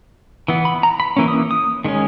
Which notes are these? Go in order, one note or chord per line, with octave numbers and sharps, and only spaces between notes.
E3 B3
B5
A#5
B5
E3 A#3 C#4
D#6
D#6
D#3 G#3 C#4